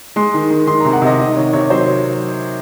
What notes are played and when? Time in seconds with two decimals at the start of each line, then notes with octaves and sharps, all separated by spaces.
0.16 G#3 C6
0.34 D#3
0.50 D#3
0.67 D#3 C6
0.80 C3 A#5
0.93 F#5
1.02 C3 D#5
1.19 D#3 D#5
1.36 D#3 C#5
1.53 C3 C#5
1.70 F#3 C5